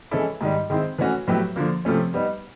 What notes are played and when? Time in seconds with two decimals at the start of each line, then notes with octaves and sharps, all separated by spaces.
0.11 E3 G#3 C#4 E4 A4
0.41 G#2 D#3 G3
0.70 D#3 G#3 C4 E4
0.98 E3 A3 C#4 F#4
1.27 A2 F#3 B3 E4 G4
1.56 D3 F3 A#3
1.85 C3 F3 A3 C#4
2.14 G3 B3 D#4